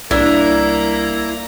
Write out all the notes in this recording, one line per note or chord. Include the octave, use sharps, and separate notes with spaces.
C2 A#3 D4 E4 A#5